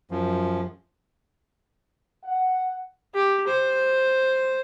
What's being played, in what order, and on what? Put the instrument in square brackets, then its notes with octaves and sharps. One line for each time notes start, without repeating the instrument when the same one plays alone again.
[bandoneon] F#2 F3
[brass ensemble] F#5
[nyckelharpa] G4
C5